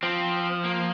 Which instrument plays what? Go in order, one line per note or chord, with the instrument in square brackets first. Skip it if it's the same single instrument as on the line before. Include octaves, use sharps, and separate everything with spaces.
[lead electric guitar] F3 [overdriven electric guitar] C4
[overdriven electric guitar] A#3